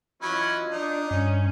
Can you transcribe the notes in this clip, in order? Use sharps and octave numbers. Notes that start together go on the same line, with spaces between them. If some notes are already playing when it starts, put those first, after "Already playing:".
E3 F#3 C#4 F4 D#5 B5
D4 D#4
G2 C#4